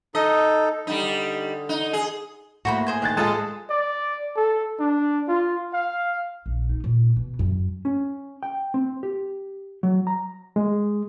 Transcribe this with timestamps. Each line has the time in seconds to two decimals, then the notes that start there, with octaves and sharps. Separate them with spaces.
0.15 D#4 A4 D#5
0.87 D3 G3 D#4
1.69 D#4
1.93 G#4
2.65 A2 A#3 F#4 C5 B5
2.87 G#4 C5 G#5
3.02 D#3 F#6 A6
3.17 G#3 F4 A4 A5
3.70 D5
4.36 A4
4.80 D4
5.28 F4
5.73 F5
6.46 A#1
6.70 D#4
6.84 A#2
7.16 B2
7.39 F#2
7.85 C#4
8.43 G5
8.74 C4
9.03 G4
9.83 F#3
10.07 A#5
10.56 G#3